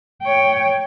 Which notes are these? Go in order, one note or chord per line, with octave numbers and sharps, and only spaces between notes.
C#5 G5